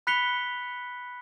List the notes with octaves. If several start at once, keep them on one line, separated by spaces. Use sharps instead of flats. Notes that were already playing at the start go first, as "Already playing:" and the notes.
B5 F#6 B6 C#7 F7 G7